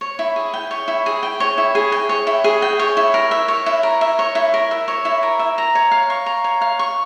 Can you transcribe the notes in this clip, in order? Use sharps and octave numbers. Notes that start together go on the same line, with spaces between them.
C#5
E4
G#4
G5
C#5
E4
G#4
G5
C#5
E4
G#4
G5
C#5
E4
G#4
G5
C#5
E4
A#4
E5
C#5
E4
A#4
E5
C#5
E4
A#4
E5
C#5
E4
A#4
E5
A#5
C#5
F5
C#6
A#5
C#5
F5
C#6